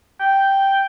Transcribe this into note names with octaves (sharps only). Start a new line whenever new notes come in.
G5